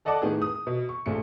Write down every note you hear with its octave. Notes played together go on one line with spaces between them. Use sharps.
A4 D5 D#5 F#5 A5 D6
A2 D#3 B3 G#4
D#6
B2
C#6
A#1 A3 C#7